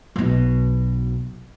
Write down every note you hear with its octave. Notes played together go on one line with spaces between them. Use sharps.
B1 B2